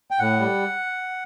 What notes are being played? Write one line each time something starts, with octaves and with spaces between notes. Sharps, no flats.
G5
A2 F#5
G3